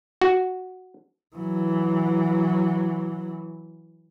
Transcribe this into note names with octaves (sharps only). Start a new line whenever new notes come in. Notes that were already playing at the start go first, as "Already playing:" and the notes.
F#4
E3 F#3